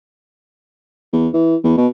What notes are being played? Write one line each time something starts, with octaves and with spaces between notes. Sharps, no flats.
E2
E3
E2
B2